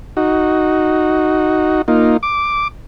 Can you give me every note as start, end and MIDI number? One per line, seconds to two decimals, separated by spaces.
0.17 1.82 63
0.17 1.82 66
1.88 2.17 58
1.88 2.17 63
1.88 2.17 65
2.23 2.68 86